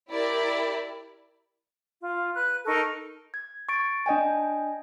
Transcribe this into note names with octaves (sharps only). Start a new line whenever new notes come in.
E4 G4 A#4 D5
F4
B4 F#6
D#4 A4 A#4 C#6
G#6
C#6 A6 D7
D4 D#5 G5 G#5